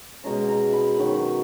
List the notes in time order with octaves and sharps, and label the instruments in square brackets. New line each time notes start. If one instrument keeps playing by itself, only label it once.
[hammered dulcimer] B2 G#3 C#4 A#5
A#5
B5
D#3 F#3 B3